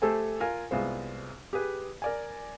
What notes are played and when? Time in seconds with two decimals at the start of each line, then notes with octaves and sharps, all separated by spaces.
0.02 A3 G4 A4 C5 G#5
0.40 F4 A#4 G#5
0.71 C2 G#3 B3 F4 C5
1.53 G4 G#4 B4
2.02 A#4 D5 G#5